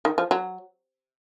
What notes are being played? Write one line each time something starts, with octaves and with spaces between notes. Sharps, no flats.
D#3
F3
F#3